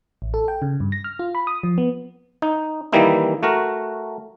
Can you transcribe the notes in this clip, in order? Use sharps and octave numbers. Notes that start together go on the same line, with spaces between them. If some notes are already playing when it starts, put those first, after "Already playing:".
A1
A4
G5
C#3
G2
A#6
F6
F4
B5
D#6
F3
B3
D#4
D#3 E3 G3 A#3 D#4 E4
A3 F#4 A#4